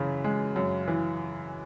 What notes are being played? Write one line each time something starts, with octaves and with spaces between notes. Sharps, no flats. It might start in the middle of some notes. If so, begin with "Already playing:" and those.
Already playing: F#2 C#3 E3
G#3
F#2
E3